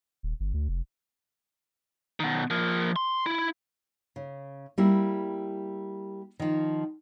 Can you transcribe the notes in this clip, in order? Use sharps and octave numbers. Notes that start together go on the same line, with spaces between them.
D#1
G1
D2
F1
B2 D#3
F3 A#3
C6
E4
C#3
G3 A#3 E4
D#3 F3